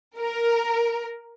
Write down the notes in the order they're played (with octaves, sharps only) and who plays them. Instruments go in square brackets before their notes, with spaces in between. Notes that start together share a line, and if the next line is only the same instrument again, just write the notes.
[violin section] A#4